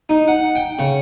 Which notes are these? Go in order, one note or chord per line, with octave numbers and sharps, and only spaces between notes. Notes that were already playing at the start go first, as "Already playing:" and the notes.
D#4
F#5
G5
C#3